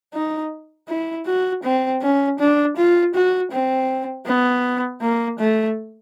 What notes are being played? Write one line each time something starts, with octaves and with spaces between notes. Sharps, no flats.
D#4
E4
F#4
C4
C#4
D4
F4
F#4
C4
B3
A#3
A3